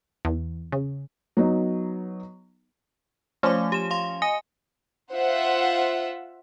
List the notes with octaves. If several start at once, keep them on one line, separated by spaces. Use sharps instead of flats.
E2
C#3
F#3 B3 D#4
F3 A3 C#4 D6
G4 E7
F5 C6
D#5 G#5
F4 C5 E5 F#5